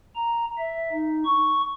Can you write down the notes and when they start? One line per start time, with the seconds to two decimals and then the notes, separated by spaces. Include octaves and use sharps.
0.16 A#5
0.58 E5
0.92 D#4
1.25 C#6